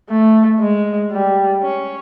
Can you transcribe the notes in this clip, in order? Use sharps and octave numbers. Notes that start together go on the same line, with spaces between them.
A3
G#3
G3
C#4